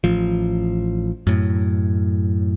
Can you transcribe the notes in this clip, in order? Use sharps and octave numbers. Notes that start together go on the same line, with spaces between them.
A1 F3
F#2 A2